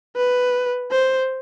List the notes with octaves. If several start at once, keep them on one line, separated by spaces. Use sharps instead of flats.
B4
C5